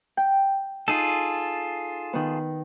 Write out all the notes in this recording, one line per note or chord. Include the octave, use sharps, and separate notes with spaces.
G5
D#4 F4 G#4 A4
D#3 B3